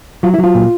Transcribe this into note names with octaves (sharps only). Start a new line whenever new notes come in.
F#3 F4
E4
F#3
F4
A#2